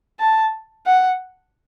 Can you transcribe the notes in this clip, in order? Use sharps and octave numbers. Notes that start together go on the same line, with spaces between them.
A5
F#5